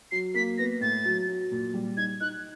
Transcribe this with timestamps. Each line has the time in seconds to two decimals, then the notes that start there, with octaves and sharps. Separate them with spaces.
0.11 F#3 C7
0.34 A#3 B6
0.58 B3 A#6
0.81 A2 A6
1.05 F#3
1.28 F#3
1.51 A#2
1.74 G3
1.97 D#4 G#6
2.20 D#4 F#6